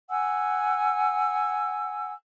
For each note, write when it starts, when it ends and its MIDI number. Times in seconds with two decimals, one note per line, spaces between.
0.09 2.12 78
0.09 2.12 80
0.09 2.12 88